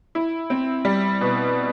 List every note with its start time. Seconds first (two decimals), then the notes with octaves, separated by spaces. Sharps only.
0.15 E4
0.50 C4
0.85 G3
1.21 B2